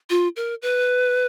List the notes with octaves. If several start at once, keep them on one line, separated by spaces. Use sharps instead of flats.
F4
A#4
B4